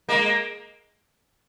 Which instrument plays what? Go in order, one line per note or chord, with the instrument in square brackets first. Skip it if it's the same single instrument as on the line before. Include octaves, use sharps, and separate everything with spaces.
[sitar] G#3 A#3